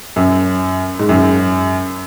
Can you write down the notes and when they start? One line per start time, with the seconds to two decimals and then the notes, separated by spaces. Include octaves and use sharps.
0.16 F#2
0.99 G#2
1.09 F#2